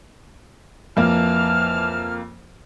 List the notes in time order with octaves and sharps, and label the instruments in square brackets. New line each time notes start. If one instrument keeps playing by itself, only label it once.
[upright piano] F2 A#3 [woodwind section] E3 A5 F6